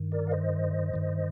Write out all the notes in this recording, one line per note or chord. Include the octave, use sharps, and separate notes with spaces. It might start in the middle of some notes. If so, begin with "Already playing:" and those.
Already playing: G2 D#3
A#4 D5
F5
C5 D#5
G2 D#3